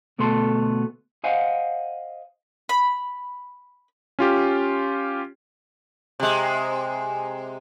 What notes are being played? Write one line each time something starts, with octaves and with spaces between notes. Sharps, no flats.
D2 B2 A3 B3 A4 C6
C5 D#5 F5 F#5 G#5
B5
C#4 F4 G4
C3 G#3